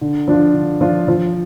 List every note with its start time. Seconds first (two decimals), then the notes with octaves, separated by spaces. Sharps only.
0.01 D3
0.28 F3 D4 F4
0.54 D3
0.81 F3 D4 F4
1.08 F3